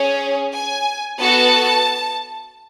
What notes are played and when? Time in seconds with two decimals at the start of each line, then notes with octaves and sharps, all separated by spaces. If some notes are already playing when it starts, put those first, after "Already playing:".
Already playing: C#4 G#4 C#5
0.54 G#5
1.20 B3 F#4 A4 A5